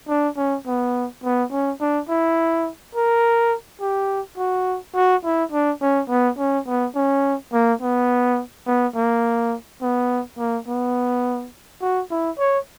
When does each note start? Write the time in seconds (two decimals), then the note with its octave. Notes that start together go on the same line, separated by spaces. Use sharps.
0.09 D4
0.37 C#4
0.67 B3
1.24 B3
1.52 C#4
1.81 D4
2.09 E4
2.95 A#4
3.81 G4
4.38 F#4
4.96 F#4
5.24 E4
5.52 D4
5.82 C#4
6.09 B3
6.39 C#4
6.67 B3
6.95 C#4
7.53 A#3
7.82 B3
8.67 B3
8.96 A#3
9.82 B3
10.38 A#3
10.68 B3
11.82 F#4
12.11 E4
12.39 C#5